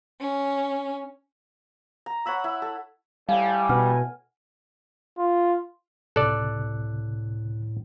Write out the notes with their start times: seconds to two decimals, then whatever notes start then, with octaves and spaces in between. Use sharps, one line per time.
0.21 C#4
2.06 A#5
2.26 C#5 F#5 B5 E6
2.44 E4
2.62 A4
3.29 A2 G3 F5 G#5
3.69 B2 F#5 F6
5.18 F4
6.16 C#2 A2 C3 A4 D5 F#6